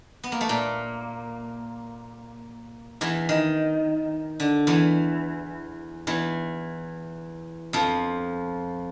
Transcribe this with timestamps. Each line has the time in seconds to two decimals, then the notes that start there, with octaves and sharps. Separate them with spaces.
0.24 B3
0.32 A#3
0.41 A3
0.49 A#2 A#3
3.01 E2 E3
3.29 D#3
4.40 D3
4.67 E2 E3
6.07 E2 E3
7.73 F2 F3